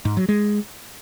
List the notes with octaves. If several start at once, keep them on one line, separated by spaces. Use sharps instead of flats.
G#2
F#3
G#3